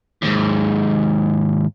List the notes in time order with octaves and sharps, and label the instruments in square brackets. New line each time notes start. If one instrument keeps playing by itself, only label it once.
[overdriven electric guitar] D#2 G#2